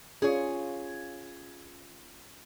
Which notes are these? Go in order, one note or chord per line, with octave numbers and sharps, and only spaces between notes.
C#4 F4 G#4 C#5